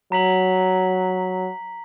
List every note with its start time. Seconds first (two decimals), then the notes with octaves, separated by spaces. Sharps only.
0.12 F#3 A#5 B6 F#7